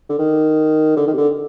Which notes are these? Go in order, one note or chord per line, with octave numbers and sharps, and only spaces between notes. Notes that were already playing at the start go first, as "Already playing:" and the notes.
D3
D#3
D3
D#3
C3
D3